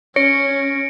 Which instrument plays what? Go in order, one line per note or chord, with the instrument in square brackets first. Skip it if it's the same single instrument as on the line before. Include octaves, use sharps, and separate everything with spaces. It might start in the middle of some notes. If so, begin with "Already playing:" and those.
[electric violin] C#4 [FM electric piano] C#5 [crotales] A#6 C#7 D7